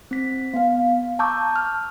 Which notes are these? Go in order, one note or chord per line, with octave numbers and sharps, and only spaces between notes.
C4 B6
B3 F5
A5 A#5 C#6 D6 E6 G6
F6